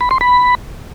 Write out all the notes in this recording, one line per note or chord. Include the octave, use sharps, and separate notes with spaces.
B5
C6
B5